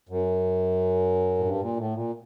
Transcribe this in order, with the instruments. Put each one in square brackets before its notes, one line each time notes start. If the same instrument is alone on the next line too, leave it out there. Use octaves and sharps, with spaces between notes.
[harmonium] F#2
A2
G2
A#2
A2
A#2